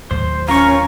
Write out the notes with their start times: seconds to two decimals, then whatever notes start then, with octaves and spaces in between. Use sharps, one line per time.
0.11 D#2 A2 F#3 C5
0.48 C#4 F4 A#4 A#5 C#6